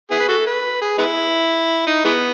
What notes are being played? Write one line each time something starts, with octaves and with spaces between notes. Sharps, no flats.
B3 E4 G#4
B4
F#4 A4
B4
G#4
G#3 B3 E4
D#4
E3 G#3 B3